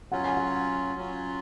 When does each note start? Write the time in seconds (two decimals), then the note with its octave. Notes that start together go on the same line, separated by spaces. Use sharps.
0.12 F#3 C#4 F4 F#5
0.24 G#5
0.37 F#5
0.95 F#3 C#4 F4